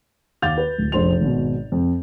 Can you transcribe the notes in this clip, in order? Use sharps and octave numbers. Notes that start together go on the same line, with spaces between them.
D#2 F5 D6 G6 A6 F7
B4
D1
F1 A#1 C5 C6 F7
G#1 B2
F2